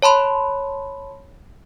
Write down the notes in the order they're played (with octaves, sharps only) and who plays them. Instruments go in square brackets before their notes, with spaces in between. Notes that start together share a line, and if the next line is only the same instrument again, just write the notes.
[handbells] C#5 A5 B5 C6